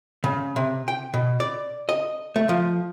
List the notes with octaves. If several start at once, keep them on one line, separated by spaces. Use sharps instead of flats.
C#3
C3
G5
B2
D5
D#5
A3
F3